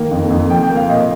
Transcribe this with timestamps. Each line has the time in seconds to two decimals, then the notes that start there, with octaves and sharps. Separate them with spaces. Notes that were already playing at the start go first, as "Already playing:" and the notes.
Already playing: D#3 A#3
0.11 F2
0.30 F2
0.50 F3 G5
0.63 G5
0.70 A#3
0.76 F5
0.88 A#2 D#5